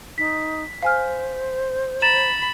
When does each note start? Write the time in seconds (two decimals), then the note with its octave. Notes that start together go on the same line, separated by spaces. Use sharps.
0.18 D#4 B6
0.83 C5 F5 G#5 F6
2.02 A#5 B5 A6 E7